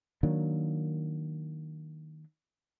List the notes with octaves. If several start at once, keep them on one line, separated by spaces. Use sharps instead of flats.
D#3 F#3 A#3 D4